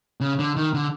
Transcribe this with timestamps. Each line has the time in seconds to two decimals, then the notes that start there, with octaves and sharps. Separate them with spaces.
0.21 C#3
0.39 D3
0.56 D#3
0.74 D3